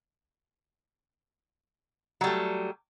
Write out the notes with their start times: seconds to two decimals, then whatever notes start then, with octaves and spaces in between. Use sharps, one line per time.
2.21 F#3
2.24 G3
2.27 A3